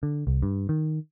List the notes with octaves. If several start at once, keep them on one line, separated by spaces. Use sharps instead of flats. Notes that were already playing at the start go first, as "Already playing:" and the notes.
D3
C2
G2
D#3